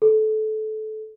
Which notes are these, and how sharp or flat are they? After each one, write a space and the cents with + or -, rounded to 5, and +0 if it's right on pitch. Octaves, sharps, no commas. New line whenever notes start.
A4 -20